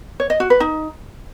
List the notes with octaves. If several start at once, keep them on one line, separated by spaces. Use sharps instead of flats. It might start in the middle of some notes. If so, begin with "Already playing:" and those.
C#5
D#5
F#4
B4
D#4